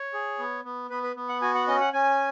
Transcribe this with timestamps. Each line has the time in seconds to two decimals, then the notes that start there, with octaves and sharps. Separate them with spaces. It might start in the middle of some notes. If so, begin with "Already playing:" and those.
Already playing: C#5
0.14 G#4
0.39 B3
0.65 B3
0.90 B3 B4
1.03 B4
1.16 B3
1.29 F#5
1.42 F#4 G#5
1.55 F#5
1.67 C#4 D#5
1.80 F#5
1.93 C#4 G#5